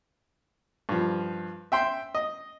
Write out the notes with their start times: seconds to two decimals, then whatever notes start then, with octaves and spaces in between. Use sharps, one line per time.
0.89 G2 F3
1.72 E5 G5 C6
2.15 D#5